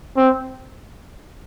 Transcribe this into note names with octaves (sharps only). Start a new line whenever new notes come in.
C4